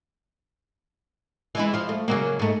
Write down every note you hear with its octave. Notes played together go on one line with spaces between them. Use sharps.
E3 G#3 E4
F3 F4
A3
C#3 F#3 A#3
G#2 A3